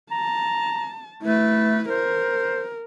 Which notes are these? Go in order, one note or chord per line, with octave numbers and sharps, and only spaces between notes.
A5 A#5
A3 E4 B4
A#4 C5